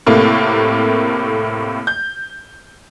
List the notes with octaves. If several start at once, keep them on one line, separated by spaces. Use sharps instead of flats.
A2 C3 A3 A#3
G6